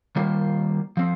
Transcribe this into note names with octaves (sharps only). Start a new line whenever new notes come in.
D#3 G3 A#3 F4 C5
F3 C4